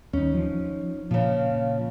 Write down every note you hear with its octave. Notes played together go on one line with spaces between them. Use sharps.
D#2 C#4 D#4
F3
A#2 C#3 F3